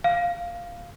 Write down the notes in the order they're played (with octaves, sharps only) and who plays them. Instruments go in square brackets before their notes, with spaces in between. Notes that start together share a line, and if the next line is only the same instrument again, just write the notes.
[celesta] F5